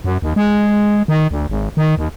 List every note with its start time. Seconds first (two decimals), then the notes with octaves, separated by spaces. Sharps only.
0.04 F#2
0.22 D#2
0.36 G#3
1.08 D#3
1.31 D2
1.50 G#1
1.77 D#3
1.98 D#2